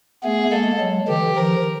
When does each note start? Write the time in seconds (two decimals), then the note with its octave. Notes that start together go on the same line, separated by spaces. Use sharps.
0.24 A3 B3 G#4
0.52 G#3 A#3 A4
0.80 F#3 G#3
1.08 D3 E3 G4
1.36 D#3 F3 A#4